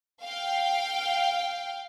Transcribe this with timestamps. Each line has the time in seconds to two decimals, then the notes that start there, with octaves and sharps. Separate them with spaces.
0.23 F5 G5